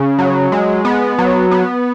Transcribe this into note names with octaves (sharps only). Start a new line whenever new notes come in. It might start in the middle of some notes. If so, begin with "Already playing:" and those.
Already playing: C#3
F#3
G#3
B3
F#3
B3